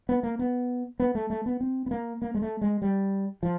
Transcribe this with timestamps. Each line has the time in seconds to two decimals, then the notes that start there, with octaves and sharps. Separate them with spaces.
0.09 B3
0.23 A#3
0.39 B3
1.00 B3
1.15 A3
1.30 A3
1.46 B3
1.61 C4
1.86 B3
1.91 A#3
2.22 A#3
2.35 G#3
2.42 A3
2.61 G#3
2.82 G3
3.43 F3